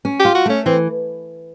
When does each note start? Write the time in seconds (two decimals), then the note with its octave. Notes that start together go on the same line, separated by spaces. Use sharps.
0.05 C#4
0.20 G4
0.25 F4
0.35 F#4
0.46 A3 C#4
0.66 E3 C4